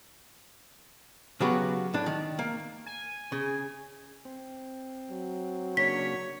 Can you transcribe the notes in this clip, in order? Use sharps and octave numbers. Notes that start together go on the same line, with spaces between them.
C#3 F#3 B3 F#4 G4 B5
A2 D4
D#3
A#3
G#5
C#3 G#4
C4
F#3
C#3 A#3 D4 C#5 B6